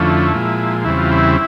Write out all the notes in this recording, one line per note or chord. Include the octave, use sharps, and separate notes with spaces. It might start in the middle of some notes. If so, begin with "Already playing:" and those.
Already playing: F2 D3 F3 A3 C#4 E4
A#2 F3 G#3
E2 C#3 E3 G3 C4 E4
F4
E4